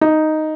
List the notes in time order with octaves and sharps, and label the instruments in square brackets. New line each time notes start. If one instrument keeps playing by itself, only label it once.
[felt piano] D#4